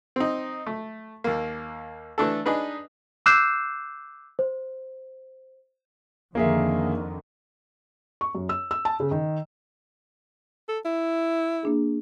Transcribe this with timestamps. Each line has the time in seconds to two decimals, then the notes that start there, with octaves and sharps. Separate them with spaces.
0.16 C4 D#4
0.66 A3
1.24 D#2 A#3
2.18 E3 A3 D4 A4
2.46 D4 D#4 G#4 B4
3.26 D6 E6 F#6 G6 C7 E7
4.39 C5
6.35 F2 D3 D#3 A#3 G#4 E5
8.21 C#6
8.35 F#2
8.49 E6
8.71 E6
8.85 A5
9.00 C#3
9.11 D#3
10.69 A4
10.85 E4
11.63 A#3 D4 G#4